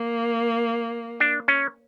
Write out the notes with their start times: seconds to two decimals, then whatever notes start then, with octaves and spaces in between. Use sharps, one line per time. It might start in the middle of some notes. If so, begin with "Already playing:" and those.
Already playing: A#3
1.20 D4
1.48 C#4